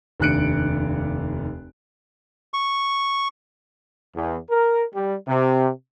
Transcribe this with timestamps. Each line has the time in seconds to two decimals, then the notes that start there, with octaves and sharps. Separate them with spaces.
0.20 F1 D#2 D4 F#6 C#7 D7
2.54 C#6
4.15 E2
4.50 A#4
4.94 G3
5.28 C3